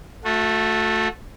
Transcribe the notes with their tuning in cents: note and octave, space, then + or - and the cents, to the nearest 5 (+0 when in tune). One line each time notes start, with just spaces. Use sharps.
A3 +0 F#4 -35